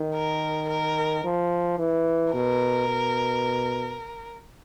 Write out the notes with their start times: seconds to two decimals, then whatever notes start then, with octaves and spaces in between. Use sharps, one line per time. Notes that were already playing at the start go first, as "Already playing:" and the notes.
Already playing: D#3
0.15 A#4
0.69 A#4
1.24 F3
1.78 E3
2.33 B2 A#4
2.88 B2